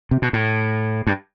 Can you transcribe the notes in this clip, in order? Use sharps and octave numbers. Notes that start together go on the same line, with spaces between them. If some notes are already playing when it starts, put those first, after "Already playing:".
C3
B2
A2
G2